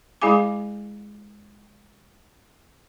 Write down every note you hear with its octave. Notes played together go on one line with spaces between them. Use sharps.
G#3 E4 G#4 F5 G#5 D6